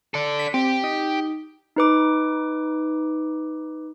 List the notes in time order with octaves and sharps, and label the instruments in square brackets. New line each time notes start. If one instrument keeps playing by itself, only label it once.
[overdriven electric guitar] A4 D5
[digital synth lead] B6
[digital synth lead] C4 [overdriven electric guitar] G4
[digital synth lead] D#4
[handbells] D#4 B4 D6